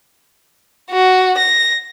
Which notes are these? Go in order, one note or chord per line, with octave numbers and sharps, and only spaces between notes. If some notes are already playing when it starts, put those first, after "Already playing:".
F#4
A#6